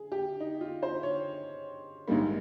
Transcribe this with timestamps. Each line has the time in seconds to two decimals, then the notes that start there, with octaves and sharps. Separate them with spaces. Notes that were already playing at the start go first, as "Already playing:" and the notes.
Already playing: G#4
0.12 G4
0.40 D#4
0.61 F4
0.83 C5
1.03 C#5
2.08 A#1 G#2 D#3 G3 A#3